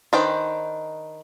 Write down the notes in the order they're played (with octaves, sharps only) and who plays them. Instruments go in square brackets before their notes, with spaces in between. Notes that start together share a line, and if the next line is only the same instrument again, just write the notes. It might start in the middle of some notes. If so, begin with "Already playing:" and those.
[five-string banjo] D#3 D4 B4 C5 G5